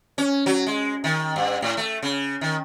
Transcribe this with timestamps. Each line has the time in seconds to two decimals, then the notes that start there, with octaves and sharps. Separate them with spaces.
0.18 C#4
0.46 F#3
0.66 G#3
1.04 D#3
1.36 G2
1.62 A2
1.77 A3
2.03 C#3
2.41 D#3